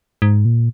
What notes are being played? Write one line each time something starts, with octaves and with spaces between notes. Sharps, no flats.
G#2
A#2